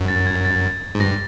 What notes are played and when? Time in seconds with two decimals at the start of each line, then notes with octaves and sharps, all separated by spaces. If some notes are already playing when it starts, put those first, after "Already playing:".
Already playing: F#2
0.08 A6
0.27 G#6
0.45 A6
0.95 G#2
1.00 G2 A#6